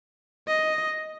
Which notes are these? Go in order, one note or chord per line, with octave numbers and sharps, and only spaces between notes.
D#5